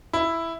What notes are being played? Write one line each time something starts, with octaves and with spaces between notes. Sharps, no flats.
E4